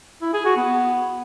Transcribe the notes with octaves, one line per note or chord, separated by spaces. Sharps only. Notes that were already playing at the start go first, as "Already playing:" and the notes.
E4
G#4
F#4
B3